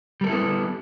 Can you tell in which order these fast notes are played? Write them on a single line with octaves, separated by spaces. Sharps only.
G3 A#4 A4 E4 B3